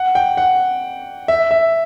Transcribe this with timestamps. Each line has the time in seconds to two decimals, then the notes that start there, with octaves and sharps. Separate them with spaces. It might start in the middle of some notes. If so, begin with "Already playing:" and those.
Already playing: F#5
0.15 G5
0.37 F#5
1.28 E5
1.51 E5